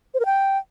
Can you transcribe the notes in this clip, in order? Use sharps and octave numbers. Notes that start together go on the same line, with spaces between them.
C5
A#4
G5